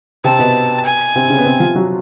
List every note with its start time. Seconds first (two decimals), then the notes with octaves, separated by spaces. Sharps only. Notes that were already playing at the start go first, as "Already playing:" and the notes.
0.24 C3 C4 A5
0.39 B2 B3
0.85 G#5
1.16 C3 C4
1.30 C#3 C#4
1.38 B3
1.45 C3 C4
1.60 F3 F4
1.76 F#3 F#4